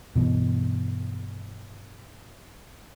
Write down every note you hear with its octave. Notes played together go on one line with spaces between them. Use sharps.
G2 B2 E3